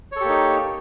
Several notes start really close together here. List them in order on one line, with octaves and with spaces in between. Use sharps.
C#5 A4 G4 A#3 D#4